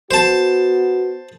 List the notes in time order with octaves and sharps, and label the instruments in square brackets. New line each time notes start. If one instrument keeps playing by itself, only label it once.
[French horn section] B3 F#4 [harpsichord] C5 A5